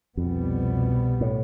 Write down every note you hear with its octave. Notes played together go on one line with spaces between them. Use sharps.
C2 F2 B2 G3 B3
A2